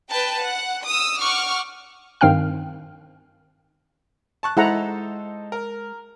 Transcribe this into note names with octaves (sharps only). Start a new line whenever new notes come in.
B4 G5 A5
F#5
D#6 E6
F#5 C#6 D6 F6
G2 D#3 C4 F5 G5 F6
A5 C#6 F#6
G#3 D#4 E4 A4 C5 F#5 A#5
A#4